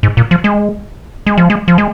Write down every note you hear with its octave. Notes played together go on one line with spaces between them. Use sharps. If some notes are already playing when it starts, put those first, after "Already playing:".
G#2
A#2
F3
G#3
G#3
F3
G#3
F3
G#3